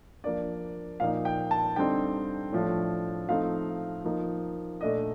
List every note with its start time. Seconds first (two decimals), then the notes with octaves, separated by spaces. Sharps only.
0.24 F3 A#3 D4 D5
1.00 A#2 F3 A#3 D#4 F5
1.25 G5
1.51 A5
1.76 D3 G3 C4 D#4 G5
2.52 A2 F3 A3 D4
3.28 F3 A3 C4 D#4 F5
4.04 F3 A#3 D#4
4.81 A#2 A3 D4 D#5